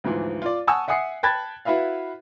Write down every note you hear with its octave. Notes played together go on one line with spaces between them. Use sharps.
D2 G#2 E3 F3
F4 D5
F#5 G#5 A5 C#6 D#6 E6
E5 F#5 G#5 D#6 C7 C#7
G5 A5 B5 F#6 G#6 A6
E4 F#4 B4 E5 F5